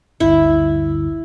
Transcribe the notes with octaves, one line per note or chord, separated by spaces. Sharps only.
G1 D2 E4